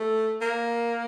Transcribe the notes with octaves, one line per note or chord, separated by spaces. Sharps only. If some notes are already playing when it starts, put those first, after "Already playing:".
Already playing: A3
A#3